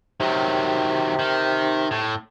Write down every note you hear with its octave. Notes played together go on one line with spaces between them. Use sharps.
C3 D#3 F#3
D#3
A2